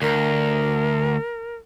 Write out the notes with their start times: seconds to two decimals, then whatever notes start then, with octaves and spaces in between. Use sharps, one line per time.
0.02 D2 A#4